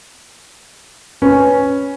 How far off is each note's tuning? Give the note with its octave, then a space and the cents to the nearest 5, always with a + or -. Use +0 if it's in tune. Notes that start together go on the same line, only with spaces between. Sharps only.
C#4 +0 B4 +0